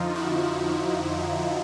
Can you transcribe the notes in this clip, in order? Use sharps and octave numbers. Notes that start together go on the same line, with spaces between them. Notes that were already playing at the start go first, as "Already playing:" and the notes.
Already playing: F2 D3 F3 D#4 F4
E4 F#4